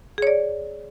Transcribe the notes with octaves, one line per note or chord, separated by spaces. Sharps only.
G#4 C#5 D5